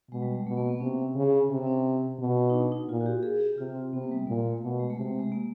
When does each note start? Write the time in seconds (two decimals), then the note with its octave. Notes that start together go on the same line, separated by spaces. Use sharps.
0.11 B2 G#3
0.22 G3
0.35 G#3
0.46 B2 A3
0.57 A#3
0.69 B3
0.80 C3 C#4
0.98 C#4
1.15 C#3
1.50 C3
1.62 C4
1.67 C#4
2.19 B2
2.50 D#4
2.54 D4
2.72 D#4
2.89 A#2 F4
3.01 F#4
3.06 G4
3.23 G#4
3.40 G4
3.58 C3 F4
3.75 C4
3.93 C3 B3
4.04 A#3
4.11 G3
4.16 G#3
4.27 A#2 A#3
4.39 A3
4.50 A3
4.61 B2 A3
4.80 G#3
4.90 A3
4.97 C3 G#3
5.08 G#3
5.19 G#3
5.32 A#3